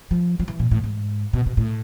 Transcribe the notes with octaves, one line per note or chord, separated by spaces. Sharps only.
F3
F3
E3
A#2
A2
G#2
B2
B2
A2